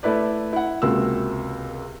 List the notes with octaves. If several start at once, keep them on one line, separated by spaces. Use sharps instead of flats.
A3 E4 B4 D5
E4 F#5
C#2 C3 A#3 F4 F#4 E6